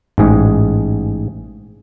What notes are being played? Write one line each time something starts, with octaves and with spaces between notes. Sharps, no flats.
A1 G#2 G#4